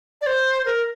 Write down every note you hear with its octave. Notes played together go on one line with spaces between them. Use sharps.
D5
C5
A#4